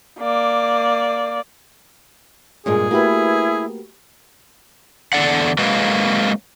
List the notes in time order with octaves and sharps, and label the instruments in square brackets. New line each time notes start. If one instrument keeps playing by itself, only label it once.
[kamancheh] A#3 D5
[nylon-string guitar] G2 A#2 G#3 [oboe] G#4
[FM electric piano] A3 F#4 G4 [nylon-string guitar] A#3 B4 [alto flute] E4
[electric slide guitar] E2 D3 A4 D5 F#5
F#3 G#3 A#3 C4 B4 F5